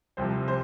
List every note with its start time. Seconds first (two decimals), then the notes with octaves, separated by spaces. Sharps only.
0.17 C2 C3 F3 C5
0.48 C5